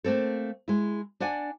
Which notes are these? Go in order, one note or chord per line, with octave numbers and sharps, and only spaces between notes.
A3 A#3 C4 A4
G#3 E4
D4 D5 F#5 G#5